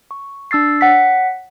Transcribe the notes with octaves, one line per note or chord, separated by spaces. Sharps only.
C#6
D4 E6 A6 C7
C#5 F#5 B6